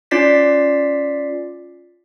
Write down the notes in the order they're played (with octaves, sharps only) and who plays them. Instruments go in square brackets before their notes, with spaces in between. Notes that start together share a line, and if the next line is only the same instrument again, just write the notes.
[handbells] C#4 F4 D5 A6 B6 C7